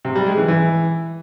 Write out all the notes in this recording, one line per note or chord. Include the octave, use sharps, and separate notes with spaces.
C3
G3
G#3
E3
E3